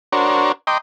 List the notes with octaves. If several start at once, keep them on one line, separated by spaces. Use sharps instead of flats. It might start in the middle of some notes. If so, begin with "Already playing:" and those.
D4 F#4 A#4 C5 C#5
D#5 G5 A#5 C6 D6